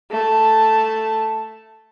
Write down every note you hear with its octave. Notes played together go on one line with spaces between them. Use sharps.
A3 A5